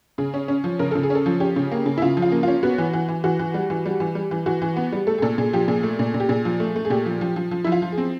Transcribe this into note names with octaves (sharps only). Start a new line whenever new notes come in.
C#3 G#4
C#4
C#4
F3
C#3 A#4
C#3 A4
G#4
C#4
A4
F3
C#4 G4
C#3
A#3
C#3
E4
C#3 F4
F3
F4
A#3
C#4 F4
B3 F#4
E3
E3
E3
E3 F#4
E3
G3
E3
G3
E3
G3
E3
E3 F#4
E3
B3
G3
A3 A4
G#4
A#2 A4
A#2 G#4
F3 G4
A#2 G#4
A3
A#2
A#2
G4
A#2 G#4
F3
A3
A3
G#4
A#2 G4
F3
F3
F3
F3
F3 E4
F4
F3
G#4
C4